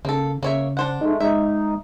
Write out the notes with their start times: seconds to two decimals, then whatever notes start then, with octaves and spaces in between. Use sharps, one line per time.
0.05 C#3 A#3 A4
0.43 C#3 A#3 C#5 E5
0.77 D4 C5 F#5
1.01 G#3 A3 D#4
1.20 G#3 D#4 E5